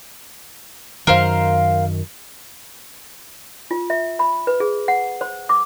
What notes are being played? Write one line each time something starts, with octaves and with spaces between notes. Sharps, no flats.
F#2 D#3 A#4 C5 F5
F4
E5
B5
B4
G#4
F#5
C5
D6